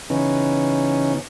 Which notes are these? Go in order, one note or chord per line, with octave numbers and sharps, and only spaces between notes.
C#3 E3 B3 C#4 D#4